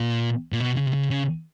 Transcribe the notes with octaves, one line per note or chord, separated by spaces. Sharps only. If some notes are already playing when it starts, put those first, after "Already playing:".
Already playing: A#2
A#2
B2
C#3
C3
C#3
C#3